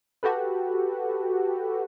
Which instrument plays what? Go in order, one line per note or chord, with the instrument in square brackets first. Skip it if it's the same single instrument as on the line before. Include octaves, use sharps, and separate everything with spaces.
[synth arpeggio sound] F#4 G4 A4 B4